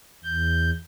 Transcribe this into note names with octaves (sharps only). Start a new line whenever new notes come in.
E2 G6